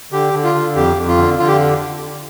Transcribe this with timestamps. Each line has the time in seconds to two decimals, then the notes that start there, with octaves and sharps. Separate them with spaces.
0.12 D3 G4
0.34 D3
0.44 F4
0.54 D3
0.75 F2 G4
0.97 F2
1.08 F4
1.17 D3
1.39 D3 F4
1.48 G4